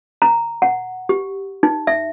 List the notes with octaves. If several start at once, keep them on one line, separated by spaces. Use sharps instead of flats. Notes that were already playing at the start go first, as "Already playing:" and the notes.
A#5
F#5
G4
D#4
E5